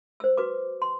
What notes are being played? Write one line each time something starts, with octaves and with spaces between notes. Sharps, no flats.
C5 E6
F#4 B4 D6
C6